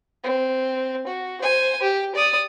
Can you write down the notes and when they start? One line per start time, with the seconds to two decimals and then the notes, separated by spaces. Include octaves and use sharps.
0.24 C4
1.07 F#4
1.41 C5 G#5
1.82 G4
2.15 D5 D#6